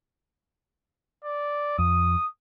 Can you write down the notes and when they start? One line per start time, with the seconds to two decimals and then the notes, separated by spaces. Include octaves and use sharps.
1.24 D5
1.79 F2 D#6